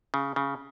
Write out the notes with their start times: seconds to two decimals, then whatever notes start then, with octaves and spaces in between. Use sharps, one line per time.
0.14 C#3
0.36 C#3